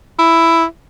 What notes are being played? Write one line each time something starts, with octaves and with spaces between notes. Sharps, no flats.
E4